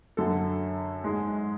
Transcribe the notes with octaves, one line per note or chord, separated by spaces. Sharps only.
F#2 D3 F#3 A4
G#2 G#3